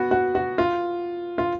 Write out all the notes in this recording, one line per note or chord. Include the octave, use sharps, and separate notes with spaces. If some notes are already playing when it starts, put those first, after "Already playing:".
Already playing: B3 F#4
F#4
F#4
F4
F4